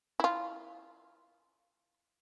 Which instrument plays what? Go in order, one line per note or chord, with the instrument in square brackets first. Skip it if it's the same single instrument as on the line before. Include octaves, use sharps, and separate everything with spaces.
[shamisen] E4 F4